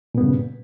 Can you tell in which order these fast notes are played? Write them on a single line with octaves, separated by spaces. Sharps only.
A#2 B3 G2 C#3